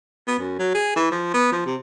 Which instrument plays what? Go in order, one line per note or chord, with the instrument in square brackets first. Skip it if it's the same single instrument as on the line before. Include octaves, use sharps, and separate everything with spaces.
[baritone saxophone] B3
F#2
F#3
G#4
E3
F3
B3
F3
C3